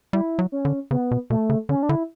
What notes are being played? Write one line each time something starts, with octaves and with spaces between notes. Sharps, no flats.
G3 E4
F#3
C#4
D3
C#3 B3
B2
B2 A3
C#3
D3 C#4
D4
D3 E4